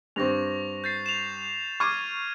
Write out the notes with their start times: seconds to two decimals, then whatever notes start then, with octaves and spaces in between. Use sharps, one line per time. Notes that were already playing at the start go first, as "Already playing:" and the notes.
0.16 G2 C4 C#6 A#6 F7
0.84 G6 A6 C7
1.06 E7 F7
1.80 C#6 D6 F6 G#6 D#7